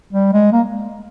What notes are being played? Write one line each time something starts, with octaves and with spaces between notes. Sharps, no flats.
G3
G#3
A#3